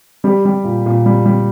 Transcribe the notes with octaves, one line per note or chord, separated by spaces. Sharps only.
G3 G4
G3
A#2
A#2
G3
G3